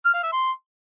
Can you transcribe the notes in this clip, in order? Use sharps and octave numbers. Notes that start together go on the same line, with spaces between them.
F6
F5
E5
C6